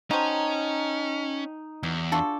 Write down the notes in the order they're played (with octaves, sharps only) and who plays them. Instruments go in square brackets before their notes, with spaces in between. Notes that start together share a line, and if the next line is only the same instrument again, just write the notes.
[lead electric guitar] C#4 [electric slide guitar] D#4 [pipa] F#4 C5 [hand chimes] G5 A5 A#5
[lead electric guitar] E2 [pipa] F#3
[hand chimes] D4 D6 [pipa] F4 F#4 A4